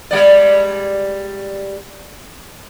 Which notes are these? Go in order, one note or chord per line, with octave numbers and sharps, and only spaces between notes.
G3 G#3 D5